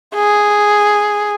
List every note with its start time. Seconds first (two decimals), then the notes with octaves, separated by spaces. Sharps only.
0.15 G#4